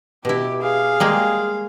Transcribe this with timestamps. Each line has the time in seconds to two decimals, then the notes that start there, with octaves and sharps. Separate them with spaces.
0.25 B2 E4 G4
0.62 G#4 F5
1.00 G3 G#3 A#3